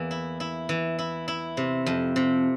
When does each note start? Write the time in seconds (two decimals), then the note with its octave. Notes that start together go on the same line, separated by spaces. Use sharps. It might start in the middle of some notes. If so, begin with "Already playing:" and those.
Already playing: E2 E3 A#3
0.11 E4
0.40 E4
0.69 E3
0.99 E4
1.28 E4
1.57 C3
1.86 F2
2.16 C3